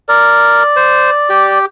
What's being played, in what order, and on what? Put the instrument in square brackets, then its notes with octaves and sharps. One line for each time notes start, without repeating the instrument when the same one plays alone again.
[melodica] A#4 [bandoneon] D5
[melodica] C5
G4